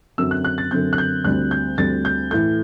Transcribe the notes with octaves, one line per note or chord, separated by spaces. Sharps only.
F#2 D3 F#3 C4 E6
F#6
F#6
A6
F#2 D3 F#3 C4 G6
F#6
G6
D2 D3 G3 C4 F#6
G6
D2 D3 G3 C4 A6
G6
A2 E3 A3 G6